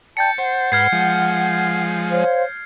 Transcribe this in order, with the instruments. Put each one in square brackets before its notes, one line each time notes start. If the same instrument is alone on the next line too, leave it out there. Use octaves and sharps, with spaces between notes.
[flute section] D5 G5 A5 [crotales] G6 A6 C#7
[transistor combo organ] C5 [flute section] F#5
[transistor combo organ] G#2 B4 [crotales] F6 G#6 C7
[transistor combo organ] F3 G#3
[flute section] C5 C#5 F5